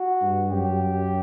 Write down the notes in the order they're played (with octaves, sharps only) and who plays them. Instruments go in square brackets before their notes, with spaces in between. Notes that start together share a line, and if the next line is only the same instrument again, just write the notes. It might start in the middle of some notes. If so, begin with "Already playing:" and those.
Already playing: [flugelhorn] F#4
[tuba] G2
[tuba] F#2 [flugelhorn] G4